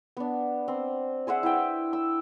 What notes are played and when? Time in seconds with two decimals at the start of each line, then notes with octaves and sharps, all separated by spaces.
0.17 B3 D4
0.68 C4
1.27 G#4 C5 E5 F#5
1.43 E4 B4 G5
1.93 E6